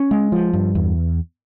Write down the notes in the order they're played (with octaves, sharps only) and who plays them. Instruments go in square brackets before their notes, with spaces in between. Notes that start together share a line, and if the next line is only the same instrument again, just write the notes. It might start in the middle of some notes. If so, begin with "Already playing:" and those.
Already playing: [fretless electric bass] C#4
G#3
F3
G2
E2